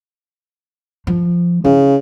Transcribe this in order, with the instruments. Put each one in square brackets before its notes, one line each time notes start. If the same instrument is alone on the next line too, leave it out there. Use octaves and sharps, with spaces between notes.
[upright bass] F3
[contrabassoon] C#3 [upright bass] E4